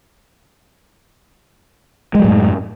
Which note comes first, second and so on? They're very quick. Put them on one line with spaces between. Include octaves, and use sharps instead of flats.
G#3 F#3 A2 F#2